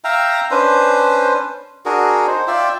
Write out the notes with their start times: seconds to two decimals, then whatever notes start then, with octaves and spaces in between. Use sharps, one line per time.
0.04 E5 F5 G5 A#5
0.51 C#4 D4 B4 C5
1.86 D4 F#4 G#4 A#4
2.27 D#4 C5
2.47 F4 D5 E5 G5